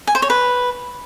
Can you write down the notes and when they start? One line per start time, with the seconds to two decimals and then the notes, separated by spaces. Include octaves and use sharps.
0.07 G#5
0.15 C5
0.22 C#5
0.30 B4